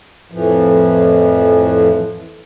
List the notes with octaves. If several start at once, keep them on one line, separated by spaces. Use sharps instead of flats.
F2 A2 E3 F3